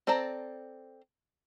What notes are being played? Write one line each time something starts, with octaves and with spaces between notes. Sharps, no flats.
C4 A4 D5 A5 A#5